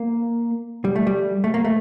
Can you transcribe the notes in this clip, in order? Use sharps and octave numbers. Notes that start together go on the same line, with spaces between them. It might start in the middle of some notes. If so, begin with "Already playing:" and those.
Already playing: A#3
G3
A3
G3
A3
A#3
A3